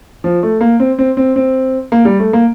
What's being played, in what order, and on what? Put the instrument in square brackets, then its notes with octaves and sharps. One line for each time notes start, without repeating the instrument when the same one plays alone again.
[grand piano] F3
A3
A#3
C4
C4
C4
C4
A#3
G3
A3
A#3